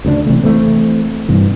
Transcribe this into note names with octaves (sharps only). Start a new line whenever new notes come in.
D2 C#3 G#3 D4
C3 E3 A3
E3 A3 C4
G2 C3 E3